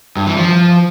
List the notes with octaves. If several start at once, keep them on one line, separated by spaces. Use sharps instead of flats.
G2
E3
F3